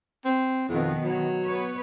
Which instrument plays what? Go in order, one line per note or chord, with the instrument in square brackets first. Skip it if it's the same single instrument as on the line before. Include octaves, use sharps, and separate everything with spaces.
[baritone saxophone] C4
[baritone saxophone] F2 [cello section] B2 D#3 B3
[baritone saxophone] F#3
[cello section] B3 B4 C#5